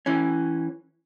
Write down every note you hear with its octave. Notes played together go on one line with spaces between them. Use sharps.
E3 C#4